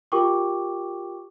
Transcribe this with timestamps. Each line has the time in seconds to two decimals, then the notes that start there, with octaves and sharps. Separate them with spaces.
0.12 F4 G4 A#4 G5 C#6 D6